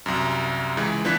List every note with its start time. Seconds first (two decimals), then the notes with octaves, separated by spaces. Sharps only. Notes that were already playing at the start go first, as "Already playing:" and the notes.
0.06 C2 F#2
0.77 C#2 E3 G#3
1.04 E3 F3 B3 D4 F#6 B6